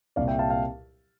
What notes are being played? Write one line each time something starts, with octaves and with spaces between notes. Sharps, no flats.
C2 A#2 G3 D5 F5
E5 G5
F5 A5
F5 A5